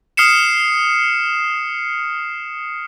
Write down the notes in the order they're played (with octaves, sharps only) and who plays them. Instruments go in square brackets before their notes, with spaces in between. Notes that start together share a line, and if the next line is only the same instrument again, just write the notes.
[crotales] D#6 F6 C7 C#7 E7